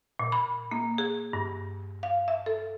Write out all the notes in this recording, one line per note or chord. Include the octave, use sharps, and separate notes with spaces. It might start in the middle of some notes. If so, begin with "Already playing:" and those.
A#2
B5
A#3
G#4
G2
F5
E5
A4